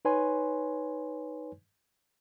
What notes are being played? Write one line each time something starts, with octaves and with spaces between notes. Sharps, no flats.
D#4 B4 C#5 G#5 C6